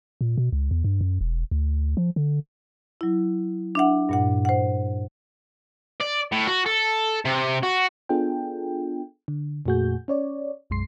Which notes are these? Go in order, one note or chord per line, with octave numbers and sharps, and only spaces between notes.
A#2
B2
C#2
E2
G2
F#2
E1
D2
F3
D3
F#3 E4
D4 E5 F#5
G2 A#2 F#5
C5 F#5
D5
A2
F#4
A4
C3
F#4
B3 D4 F4 G#4 A4 G5
D3
F2 A#2 A3 F#4 G#4 G6
C#4 C#5 D5
B1 F#2 G#3 C6 C7